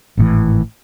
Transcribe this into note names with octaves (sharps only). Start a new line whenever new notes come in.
G#1 A2 E3